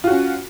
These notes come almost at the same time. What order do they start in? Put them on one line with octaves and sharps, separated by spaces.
F4 F#4 C#4